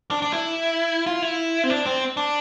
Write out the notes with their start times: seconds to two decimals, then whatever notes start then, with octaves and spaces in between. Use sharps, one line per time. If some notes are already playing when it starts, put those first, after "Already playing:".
0.11 D4
0.22 D4
0.33 E4
1.06 F4
1.22 E4
1.64 C4
1.70 D4
1.86 C4
2.17 D4